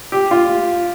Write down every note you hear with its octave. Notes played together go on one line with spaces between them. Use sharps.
G4
F4